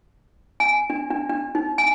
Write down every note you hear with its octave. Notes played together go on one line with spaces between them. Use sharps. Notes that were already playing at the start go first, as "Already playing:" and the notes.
G#5
D4
D4
D4
D#4
G#5